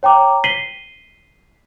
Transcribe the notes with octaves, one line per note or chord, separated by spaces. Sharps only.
C#5 G5 A#5 D6
B6 C7 D#7 F#7 G7